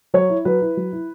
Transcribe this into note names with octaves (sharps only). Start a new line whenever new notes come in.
F#3 C#5
E4
F#3 B4
E4
F#3
E4